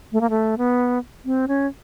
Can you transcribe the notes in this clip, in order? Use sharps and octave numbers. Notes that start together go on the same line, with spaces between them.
A3
A#3
A3
B3
C4
C#4